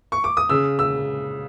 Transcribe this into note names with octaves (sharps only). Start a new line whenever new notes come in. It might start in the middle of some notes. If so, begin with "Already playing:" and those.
C#6
D6
D#6
C#3 E6
E6